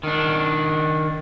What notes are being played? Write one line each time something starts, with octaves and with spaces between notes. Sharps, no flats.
D#3 D4